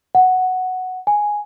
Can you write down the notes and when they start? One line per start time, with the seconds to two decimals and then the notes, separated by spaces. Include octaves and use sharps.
0.15 F#5
1.07 G#5